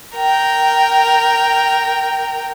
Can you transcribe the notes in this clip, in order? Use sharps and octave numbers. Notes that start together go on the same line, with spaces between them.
A#4 G5